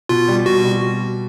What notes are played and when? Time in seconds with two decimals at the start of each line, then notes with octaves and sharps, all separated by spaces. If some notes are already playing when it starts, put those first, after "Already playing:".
0.09 B2 F4
0.28 G3
0.46 B2 F#4
0.64 G3